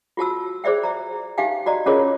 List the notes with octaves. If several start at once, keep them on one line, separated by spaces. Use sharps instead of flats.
F4 F#4 A5 E6
G#4 C5 D5 E5 G5
E5 A#5
D#4 G4 E5 F5 G5 G#5
F#4 D5 D#5 A#5
C#4 F4 G#4 A#4 C#5 D#5